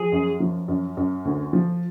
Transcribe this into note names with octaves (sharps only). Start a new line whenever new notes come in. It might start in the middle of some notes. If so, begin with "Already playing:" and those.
Already playing: F3 G#4
F#2
F3
F#2
F#2
D2
F3